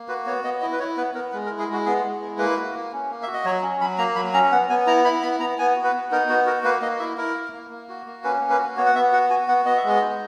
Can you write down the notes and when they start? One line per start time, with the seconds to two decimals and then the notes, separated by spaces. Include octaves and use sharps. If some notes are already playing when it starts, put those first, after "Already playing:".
Already playing: A#3
0.08 F#4 B4
0.26 B3 C#5
0.44 B3 D#5
0.61 E4 D#5
0.72 B4
0.79 E4 C#5
0.97 B3 B4
1.14 B3 A#4
1.32 G#3 B4
1.46 A#4
1.50 E4
1.59 G#4
1.69 G#3 F#4
1.86 B3 G#4
2.04 G#3
2.21 E4
2.38 A#3 B4
2.57 F#4
2.74 A#3
2.92 C#4
3.10 A#3
3.23 F#4 E5
3.33 D#5
3.45 F#3 C#5
3.63 C#4
3.81 F#3 B5
3.98 A#3 A#5
4.16 F#3 B5
4.34 C#4 A#5
4.52 B3 F#5
4.70 B3 G#5
4.87 E4 A#5
5.05 E4 B5
5.23 B3 B5
5.40 B3 A#5
5.58 B3 G#5
5.76 F#4
5.84 B4
5.93 B3
6.11 D#4 A#4
6.29 B3 F#4
6.46 F#4 A#4
6.64 A#3 B4
6.82 A#3 D#5
7.00 E4 E5
7.17 E4 A#4
7.35 A#3
7.52 A#3
7.70 A#3
7.89 F#4
8.06 A#3
8.24 C#4 B4
8.41 A#3
8.50 B4
8.59 F#4
8.77 B3 C#5
8.86 F#5
8.95 B3 E5
9.13 F#4 F#5
9.30 F#4 G#5
9.48 B3 F#5
9.66 B3 D#5
9.77 E5
9.84 G#3 D#5
10.01 D#4